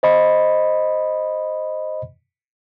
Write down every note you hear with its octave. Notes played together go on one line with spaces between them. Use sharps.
C5 D#5 B5